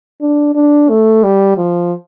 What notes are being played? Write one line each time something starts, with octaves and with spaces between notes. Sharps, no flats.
D4
D4
A3
G3
F3